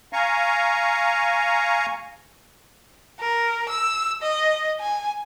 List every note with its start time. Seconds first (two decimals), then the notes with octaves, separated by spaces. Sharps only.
0.13 F5 G#5 A#5 C#6
3.20 A#4
3.69 E6
4.22 D#5
4.80 G#5